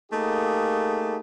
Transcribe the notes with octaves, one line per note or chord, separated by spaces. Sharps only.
A3 A#3 D#4 G4 G#4